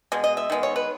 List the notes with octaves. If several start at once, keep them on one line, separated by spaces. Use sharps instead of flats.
B2 G#3
D#5
E5
D#3 G#3 B3
C#5
B4